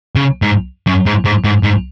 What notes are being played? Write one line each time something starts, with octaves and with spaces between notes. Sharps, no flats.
C#3
G#2
F#2
G#2
G#2
G#2
G#2